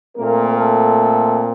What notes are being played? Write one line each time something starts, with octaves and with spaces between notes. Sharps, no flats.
A#2 A3 A#3 C4 A#4
A3 A4